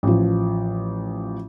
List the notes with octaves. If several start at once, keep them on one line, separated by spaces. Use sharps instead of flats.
A1 F3